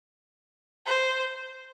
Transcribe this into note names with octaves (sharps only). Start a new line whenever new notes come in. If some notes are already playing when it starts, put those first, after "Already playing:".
C5